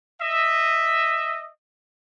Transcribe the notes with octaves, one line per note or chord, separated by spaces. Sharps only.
D#5 E5